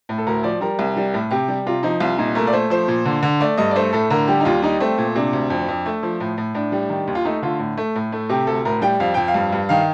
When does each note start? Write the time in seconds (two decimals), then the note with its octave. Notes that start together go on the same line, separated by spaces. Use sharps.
0.09 A2
0.18 A4
0.27 D2 A#4
0.43 F3 D5
0.61 G3 A#4
0.79 C2
0.96 G3
1.14 A2
1.31 C3 G4
1.48 G3
1.67 C3 F4
1.83 F3 D#4
2.00 C2 F4
2.18 A#2 D#4
2.35 A3 A#4
2.47 D5
2.53 A3 C5
2.70 F3 C5
2.88 A#2
3.05 D3
3.23 D3
3.40 A3 D5
3.57 G2 D#5
3.71 D5
3.76 A3 C5
3.93 A2 A4
4.10 D3 A#4
4.28 G3 G4
4.40 D#4
4.45 D#2 F4
4.62 G3 D#4
4.80 A3 C4
4.98 A#2
5.16 C3 D4
5.33 D2
5.50 F2
5.68 F2
5.86 A3
6.03 F3
6.20 A2
6.38 A2
6.54 A2 D4
6.72 G3
6.90 D#3
7.07 D#2
7.15 F4
7.25 A3 D#4
7.42 D3 F4
7.59 A2
7.77 A3
7.95 A2
8.12 A3
8.29 C3 G4
8.47 D2 A4
8.65 A2 A#4
8.82 G3 G5
9.00 F2 F5
9.14 F2 G5
9.28 F5
9.34 G2
9.52 G2
9.69 D#3 F5